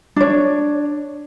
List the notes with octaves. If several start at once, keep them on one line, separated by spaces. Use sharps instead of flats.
D4 C#5